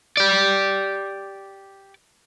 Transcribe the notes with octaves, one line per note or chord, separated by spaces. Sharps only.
G4 D5